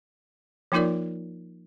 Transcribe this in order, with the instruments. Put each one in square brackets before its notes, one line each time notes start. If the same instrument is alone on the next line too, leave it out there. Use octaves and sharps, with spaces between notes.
[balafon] F3 A#3 D#4 F4 A#4 D5